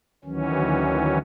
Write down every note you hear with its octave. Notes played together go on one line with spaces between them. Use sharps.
D2 D#3 E3 F#3 C#4